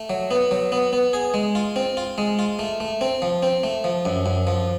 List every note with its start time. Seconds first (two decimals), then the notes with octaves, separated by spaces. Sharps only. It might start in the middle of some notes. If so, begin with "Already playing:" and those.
Already playing: A3
0.10 F#3
0.31 B3
0.51 F#3
0.72 B3
0.93 B3
1.13 G#4
1.34 G#3
1.55 F4
1.76 C4
1.97 F4
2.18 G#3
2.39 F4
2.59 A3
2.80 A3
3.01 C4
3.22 F3
3.43 C4
3.63 A3
3.84 F3
4.05 F#2
4.26 F#2
4.47 F3